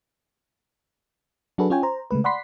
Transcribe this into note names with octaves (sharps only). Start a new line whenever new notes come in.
F#3 D4 F#4 G#4 A4 B4
C#4 F4 C#5 G5 G#5
C5 A#5
C#3 G#3 A3 B4
D5 F#5 B5 C6 B6 C7